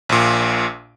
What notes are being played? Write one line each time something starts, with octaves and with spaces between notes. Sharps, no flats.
A#1 A#2